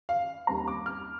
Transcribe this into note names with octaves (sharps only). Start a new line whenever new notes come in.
F5
D#2 D#3 G3 C4 A#5
D6
F6